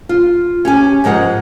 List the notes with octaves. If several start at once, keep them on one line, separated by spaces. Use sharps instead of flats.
F4
C#4 G4 G#5
G#2 F3 G#3 A#4 F#5